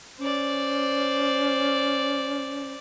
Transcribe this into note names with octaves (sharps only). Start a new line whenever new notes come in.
C#4 C5 D5